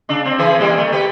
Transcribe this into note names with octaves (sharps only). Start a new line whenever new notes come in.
C#3 D4
C4
E3 G#4 B4
E3 G3 A#3
A3
G4 B4